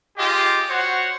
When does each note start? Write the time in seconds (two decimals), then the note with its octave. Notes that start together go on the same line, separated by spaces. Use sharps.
0.17 F4 G4 G#4 D#5
0.68 F#4 C5 C#5 F#5